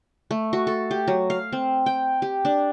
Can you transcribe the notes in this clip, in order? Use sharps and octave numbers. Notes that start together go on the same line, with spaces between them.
A3
F#4
A4
G4
F#3
F5
C4
G5
G4
D4